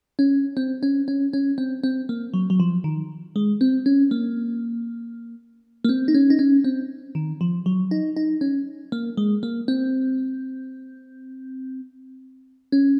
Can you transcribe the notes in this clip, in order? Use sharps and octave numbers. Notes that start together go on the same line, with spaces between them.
C#4
C4
C#4
C#4
C#4
C4
C4
A#3
F#3
F#3
F3
D#3
G#3
C4
C#4
A#3
A#3
C4
D#4
C#4
D#4
C#4
C4
D#3
F3
F#3
D#4
D#4
C#4
A#3
G#3
A#3
C4
C#4